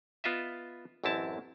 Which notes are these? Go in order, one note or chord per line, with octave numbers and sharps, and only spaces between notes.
B3 F4 D#5 E5
A1 F#2 C4 E4 A5